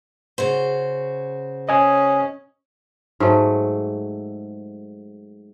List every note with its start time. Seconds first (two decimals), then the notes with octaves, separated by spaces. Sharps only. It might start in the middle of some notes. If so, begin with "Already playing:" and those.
0.38 C#3 F#4 C5
1.69 C#4 D#5 G#5 D#6
3.20 G#2 F#3 A3